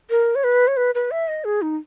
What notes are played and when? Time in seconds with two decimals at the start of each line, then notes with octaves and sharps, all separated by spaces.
0.10 A#4
0.35 C#5
0.44 B4
0.68 C#5
0.77 B4
0.95 B4
1.11 E5
1.28 D#5
1.44 G#4
1.62 D#4